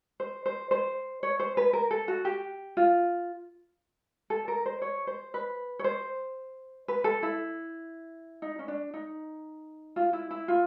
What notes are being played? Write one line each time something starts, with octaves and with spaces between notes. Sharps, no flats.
C5
C5
C5
C#5
C5
B4
A#4
A4
F#4
G4
F4
A4
A#4
C5
C#5
C5
B4
C#5
C5
B4
A4
E4
D#4
C#4
D4
D#4
F4
E4
E4
F4